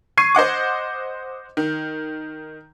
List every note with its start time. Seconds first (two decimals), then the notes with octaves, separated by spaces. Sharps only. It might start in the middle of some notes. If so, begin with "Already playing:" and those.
0.17 C#6 G#6 C7 D#7
0.35 C5 D#5 F#5 D6
1.57 D#3